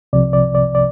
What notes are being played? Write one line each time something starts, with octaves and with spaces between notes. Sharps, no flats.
C2 C3 F3 D5
D5
D5
D5